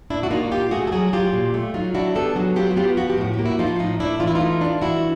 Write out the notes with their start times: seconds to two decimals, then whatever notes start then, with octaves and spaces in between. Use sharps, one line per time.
0.10 A#2 D4 E4
0.23 F#4
0.30 A#3 D#4 F4
0.51 A#2 F4 G4
0.71 A3 F#4 G#4
0.87 A4
0.92 F#3 F#4 G#4
1.13 F#3 F4 G4
1.33 A#2
1.54 A3
1.74 F#3 D#4 F4
1.95 D4 E4 F#4
2.15 B3 G4 A4
2.36 F#3 F#4 G#4
2.56 B3 F4 G4
2.71 F#4
2.76 B3 F4 G4
2.97 F3 F#4
3.10 G4
3.18 A2 F#4
3.34 G4
3.39 A#3
3.45 E4 F#4
3.59 F3 D#4 F4
3.79 A2 D#4
4.00 A2 D4 E4
4.20 E3 F4
4.27 E4
4.35 D#4 F4
4.41 A3
4.61 D4
4.81 E3 E4 F#4